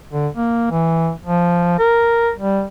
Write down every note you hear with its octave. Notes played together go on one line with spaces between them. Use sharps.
D3
A#3
E3
F3
A#4
G3